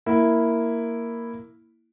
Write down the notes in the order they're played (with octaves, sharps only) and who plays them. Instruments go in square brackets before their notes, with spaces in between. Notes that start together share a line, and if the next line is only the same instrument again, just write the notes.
[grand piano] A#3 E4